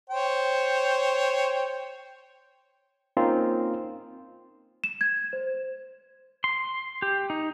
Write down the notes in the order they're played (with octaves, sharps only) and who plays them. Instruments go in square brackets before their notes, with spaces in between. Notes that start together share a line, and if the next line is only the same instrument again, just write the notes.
[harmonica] C5 C#5 G5
[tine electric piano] A#3 C4 C#4 D#4 F4
[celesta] E7
G#6
C5
[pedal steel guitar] C6
G4
D#4